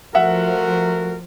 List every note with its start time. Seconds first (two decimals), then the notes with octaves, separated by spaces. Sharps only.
0.15 F3 A3 F#4 A#4 E5 F#5